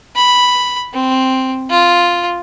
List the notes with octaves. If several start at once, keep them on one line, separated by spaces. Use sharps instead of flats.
B5
C4
F4